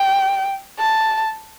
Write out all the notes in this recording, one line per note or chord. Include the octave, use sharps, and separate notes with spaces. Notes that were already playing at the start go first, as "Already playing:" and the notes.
Already playing: G5
A5